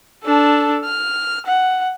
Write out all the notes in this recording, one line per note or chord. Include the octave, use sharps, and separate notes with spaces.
D4 A4
F6
F#5